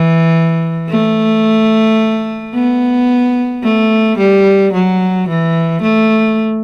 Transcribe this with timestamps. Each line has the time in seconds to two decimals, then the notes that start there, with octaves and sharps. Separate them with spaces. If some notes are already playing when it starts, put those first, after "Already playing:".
Already playing: E3
0.90 A3
2.54 B3
3.63 A3
4.18 G3
4.73 F#3
5.29 E3
5.82 A3